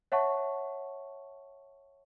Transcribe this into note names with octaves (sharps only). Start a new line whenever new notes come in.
C#5 E5 F#5 A5 C#6